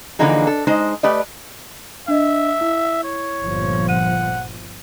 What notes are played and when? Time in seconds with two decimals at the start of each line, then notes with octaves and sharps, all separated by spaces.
0.19 D3 E3 F3 A#3 D#4 G#4
0.47 A4
0.67 G#3 D#4 C5 D#5
1.03 A3 G4 B4 D5 D#5
2.08 D4 D#5 E5
2.61 E4
3.04 C#5
3.43 G1 A#2 F3
3.89 F#5 D#7